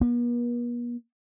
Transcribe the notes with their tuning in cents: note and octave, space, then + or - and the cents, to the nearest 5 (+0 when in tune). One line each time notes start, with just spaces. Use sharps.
B3 -45